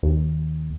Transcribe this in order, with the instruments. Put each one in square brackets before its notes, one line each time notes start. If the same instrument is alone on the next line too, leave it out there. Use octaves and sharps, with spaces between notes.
[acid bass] D#2